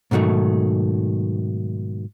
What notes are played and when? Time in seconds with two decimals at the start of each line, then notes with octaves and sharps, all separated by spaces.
0.11 G#2 B2 D#3 F#3 A3